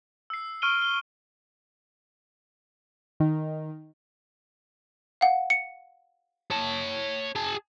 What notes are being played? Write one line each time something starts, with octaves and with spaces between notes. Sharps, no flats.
E6 C7
C#6 F6 D7 D#7 G7
G7
D#3
F5 F#5
C#7
C#5 A5
G#4 A5